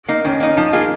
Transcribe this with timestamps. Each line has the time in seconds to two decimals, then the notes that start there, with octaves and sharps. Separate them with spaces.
0.08 A#3 D#4
0.25 D#3 C#4
0.40 A#3 D#4
0.56 F3 D#4
0.73 A#3 F4 G#4